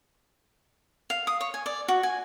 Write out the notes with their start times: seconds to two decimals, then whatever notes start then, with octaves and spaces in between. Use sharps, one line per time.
1.10 F5
1.27 D#6
1.41 C#5
1.54 G#5
1.66 D5
1.88 F#4
2.03 G#5